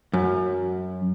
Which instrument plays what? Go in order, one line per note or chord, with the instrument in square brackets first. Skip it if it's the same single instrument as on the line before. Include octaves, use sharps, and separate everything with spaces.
[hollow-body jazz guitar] F#2